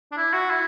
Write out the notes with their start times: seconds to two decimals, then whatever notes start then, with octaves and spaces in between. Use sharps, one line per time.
0.12 D4
0.17 E4
0.33 F#4
0.50 E4